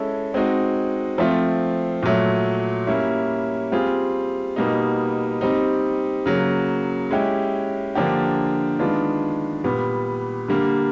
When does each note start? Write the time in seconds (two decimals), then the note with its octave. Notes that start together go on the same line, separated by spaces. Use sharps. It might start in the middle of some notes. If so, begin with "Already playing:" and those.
Already playing: G#3 C#4 E4 A4
0.34 G#3 C4 D#4 F#4
1.18 F3 A3 C4 F4
2.03 A#2 F#3 A3
2.87 G3 A#3 C#4 E4
3.72 G3 C4 F4 G#4
4.56 B2 G3 A#3 D#4
5.41 G3 C4 D#4
6.26 C#3 F#3 A#3
7.11 G#3 C#4 E4 G4
7.95 D3 F3 A#3 D4 G4
8.79 D#3 G#3 B3 D4 F4
9.64 A#2 G3 B3
10.48 D3 G3 A#3